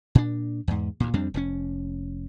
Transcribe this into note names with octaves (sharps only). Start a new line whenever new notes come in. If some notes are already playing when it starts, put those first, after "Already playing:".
A#2 D4
E2 G#2
D2 A#2
F2 G3 C4 D4
F1 A2 C#4